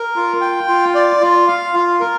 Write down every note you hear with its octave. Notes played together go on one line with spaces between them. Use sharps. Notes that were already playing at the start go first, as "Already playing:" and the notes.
Already playing: A#4
F4
G5
F4
D5
F4
F5
F4
A#4